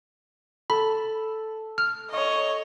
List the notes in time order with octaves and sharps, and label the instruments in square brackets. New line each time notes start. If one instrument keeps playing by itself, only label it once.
[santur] A4 [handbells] B5
[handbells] F6
[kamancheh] C#5 D#5